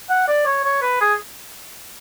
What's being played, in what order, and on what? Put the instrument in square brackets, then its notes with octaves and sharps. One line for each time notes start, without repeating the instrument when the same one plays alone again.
[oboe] F#5
D5
C#5
C#5
B4
G#4